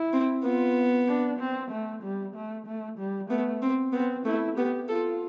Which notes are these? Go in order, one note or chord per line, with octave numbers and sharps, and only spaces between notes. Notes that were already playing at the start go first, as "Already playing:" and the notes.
Already playing: E4
C4
B3 F4
D4
C4
A3
G3
A3
A3
G3
A3 B3
C4
B3 C4
A3 E4
B3 G4
F4 A4